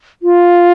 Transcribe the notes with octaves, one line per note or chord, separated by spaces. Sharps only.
F4